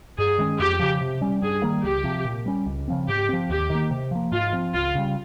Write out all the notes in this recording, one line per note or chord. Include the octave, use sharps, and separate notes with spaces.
G2 G#4
D#3 G#3 C#4
F2 G4
C#3 F3
C3
G3 C#4
G2 G#4
D#3 G3 A#3
C#2 G4
C3 F3
A#2
G3 C#4
C#2
C#3 F3 C4
G#2 G4
F3 C4
D#2 G4
D#3 A#3
C3
F3 A#3
G#2 F4
F3 C4
C#2 F4
C#3 G3